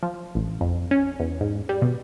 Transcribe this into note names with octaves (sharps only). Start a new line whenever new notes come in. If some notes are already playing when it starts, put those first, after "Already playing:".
F3
A1
F2
C#4
E2
G#2
G3
B2